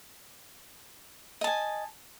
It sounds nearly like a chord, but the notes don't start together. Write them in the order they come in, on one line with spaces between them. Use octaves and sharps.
D#5 A5 G#5